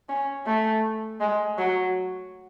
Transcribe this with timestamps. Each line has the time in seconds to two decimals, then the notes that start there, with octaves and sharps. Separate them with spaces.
0.09 C#4
0.46 A3
1.20 G#3
1.58 F#3